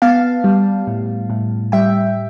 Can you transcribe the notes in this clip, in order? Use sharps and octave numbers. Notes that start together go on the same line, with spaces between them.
B3 F5 A5
G3
A2
A2
G3 E5 G5